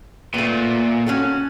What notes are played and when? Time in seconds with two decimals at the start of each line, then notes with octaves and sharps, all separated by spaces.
0.34 A#2 A3 B3
1.06 C#4 F#4 A4